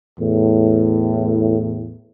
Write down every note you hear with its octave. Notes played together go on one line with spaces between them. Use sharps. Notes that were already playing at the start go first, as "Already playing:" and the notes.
E2 A2